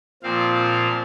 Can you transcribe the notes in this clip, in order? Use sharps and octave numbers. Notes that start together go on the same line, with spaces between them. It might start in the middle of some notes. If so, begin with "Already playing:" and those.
A#2 F3 C4 F5
F5